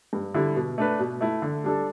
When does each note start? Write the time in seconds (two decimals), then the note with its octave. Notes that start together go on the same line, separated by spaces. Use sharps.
0.13 G2
0.34 D3 G3 E4
0.56 B2
0.78 A3 D4 B4
1.00 B2
1.21 A3 E4
1.42 D3
1.64 G3 D4 A4